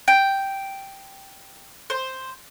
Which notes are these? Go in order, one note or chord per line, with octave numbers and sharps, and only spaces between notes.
G5
C5